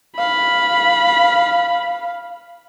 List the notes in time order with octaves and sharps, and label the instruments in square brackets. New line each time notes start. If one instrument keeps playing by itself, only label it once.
[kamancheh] F5 [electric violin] B5